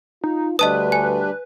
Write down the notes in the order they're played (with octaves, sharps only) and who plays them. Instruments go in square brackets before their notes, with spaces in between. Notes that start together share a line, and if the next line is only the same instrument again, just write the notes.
[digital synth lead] D#4 [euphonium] F4
[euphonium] D2 [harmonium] G3 D4 [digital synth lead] B4 [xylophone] D#5 A5 D#6
[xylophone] G#5